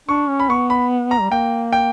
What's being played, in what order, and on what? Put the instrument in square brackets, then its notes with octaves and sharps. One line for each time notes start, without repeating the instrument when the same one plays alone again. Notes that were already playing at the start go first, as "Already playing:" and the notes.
[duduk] D4 [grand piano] C#6
[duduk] C#4
[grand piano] B5
[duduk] B3 [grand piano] C#6
[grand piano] B5
A#5
[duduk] G3
[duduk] A#3 [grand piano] G5
[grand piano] G5